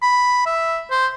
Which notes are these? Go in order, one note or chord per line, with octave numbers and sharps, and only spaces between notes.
B5
E5
C5